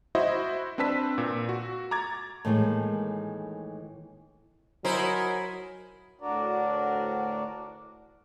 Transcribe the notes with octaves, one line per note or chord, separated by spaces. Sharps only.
E4 F#4 C5 D#5 E5
C4 D4 B4 A5 E6 B6
A#2
F#4
A#5 D6 G#6 A6
A2 D#3 E3 G3 G#3 A#3
F#3 D#4 E4 A#4 C5 G#5 B5
D2 A2 D4 F#4 A#4 D5